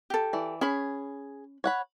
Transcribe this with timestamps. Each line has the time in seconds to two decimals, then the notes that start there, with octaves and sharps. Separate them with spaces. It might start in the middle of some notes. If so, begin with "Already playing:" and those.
0.10 G4 A4
0.33 E3 D5
0.61 C#4 G#4 C#5 B5
1.64 C#5 F#5 B5